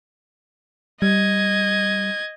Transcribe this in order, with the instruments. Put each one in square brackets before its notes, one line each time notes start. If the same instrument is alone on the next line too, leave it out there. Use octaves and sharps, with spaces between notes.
[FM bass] G3 [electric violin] D#5 G#6